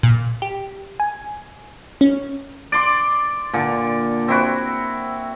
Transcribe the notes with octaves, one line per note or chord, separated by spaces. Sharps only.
A#2
G4
G#5
C#4
D5 C6 D6
A#2 D3
C4 E4 F#4